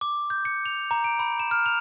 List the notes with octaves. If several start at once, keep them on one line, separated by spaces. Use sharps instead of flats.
D6
G6
C#7
F7
A#5
D7
B5
E7
F6
F7